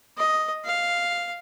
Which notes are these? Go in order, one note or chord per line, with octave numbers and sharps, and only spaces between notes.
D#5
F5